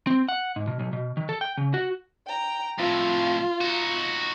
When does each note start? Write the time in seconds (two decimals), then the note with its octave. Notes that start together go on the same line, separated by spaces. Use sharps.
0.07 C4
0.29 F#5
0.56 G#2
0.68 B2
0.80 B1
0.93 B2
1.17 D#3
1.29 A4
1.41 G5
1.57 C#3
1.74 F#4
2.27 G5 A#5
2.79 F2 A2 F4
3.61 D#4 F#4